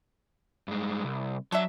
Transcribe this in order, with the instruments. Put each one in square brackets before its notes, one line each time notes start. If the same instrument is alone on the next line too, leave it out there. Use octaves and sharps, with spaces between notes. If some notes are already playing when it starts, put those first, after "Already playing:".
[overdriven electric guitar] G2 G#3
C2
[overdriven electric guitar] F#3 [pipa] D4 F#4 E5